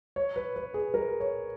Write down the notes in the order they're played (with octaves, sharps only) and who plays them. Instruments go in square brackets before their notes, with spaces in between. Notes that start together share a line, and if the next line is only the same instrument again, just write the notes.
[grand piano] C#5
B4
B4
G#4
A#4
C#5